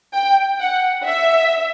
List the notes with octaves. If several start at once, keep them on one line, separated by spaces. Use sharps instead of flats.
G5
F#5
E5